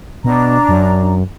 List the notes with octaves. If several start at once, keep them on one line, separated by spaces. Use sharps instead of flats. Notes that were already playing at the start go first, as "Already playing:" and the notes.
B2 D4 A#5
F#2